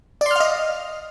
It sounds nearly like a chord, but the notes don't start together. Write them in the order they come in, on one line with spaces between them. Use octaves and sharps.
D5 C6 F6 F5 D#5